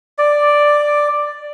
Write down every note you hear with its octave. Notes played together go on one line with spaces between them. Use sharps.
D5